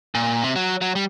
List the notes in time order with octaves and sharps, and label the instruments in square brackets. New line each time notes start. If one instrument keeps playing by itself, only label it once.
[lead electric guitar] A#2
C3
F#3
F#3
G3